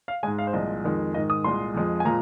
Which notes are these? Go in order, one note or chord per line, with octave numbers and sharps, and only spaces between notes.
F5
G#2 G#3 G#5
F5
C5
C2 A#2 F3 G#3 D#5
F2 D#3 G#3
G#2 D#3 G#3 D#5
D#6
C2 A#2 G#3 C6
F2 F3 G#3
G#5
A#2 F3 G#3 A#5